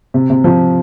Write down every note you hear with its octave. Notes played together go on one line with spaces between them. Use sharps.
C3
C3
F3